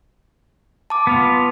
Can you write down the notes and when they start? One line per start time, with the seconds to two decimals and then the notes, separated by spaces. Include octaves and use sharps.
0.90 A5 D6
1.07 B3 F4